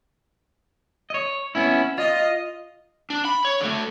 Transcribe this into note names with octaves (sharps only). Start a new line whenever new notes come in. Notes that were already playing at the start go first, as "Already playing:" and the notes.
C#5 D#5
B3 C#4 E4
F4 D#5
D4
B5
C#5
D3 A3